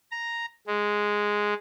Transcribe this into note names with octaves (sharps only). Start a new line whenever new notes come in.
A#5
G#3